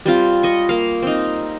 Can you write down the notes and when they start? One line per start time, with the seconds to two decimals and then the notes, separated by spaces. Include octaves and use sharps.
0.06 G3 C4 F4
0.43 D#5 C#6
0.69 A#3 F5
1.02 C4 D#4